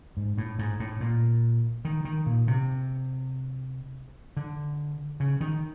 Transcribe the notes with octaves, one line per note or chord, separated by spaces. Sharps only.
G#2
A2
G#2
A2
A#2
D#3
D#3
A#2
C3
D3
C#3
D#3